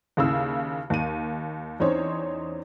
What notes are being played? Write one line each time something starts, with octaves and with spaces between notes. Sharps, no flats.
D#2 C#3 E4 E6
D#2 D#7
E2 C4 C#4 D#4 C5 C#5